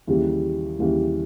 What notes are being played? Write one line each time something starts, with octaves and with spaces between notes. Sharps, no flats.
D#2 C#3 E3 G3
D#2 C#3 E3 G3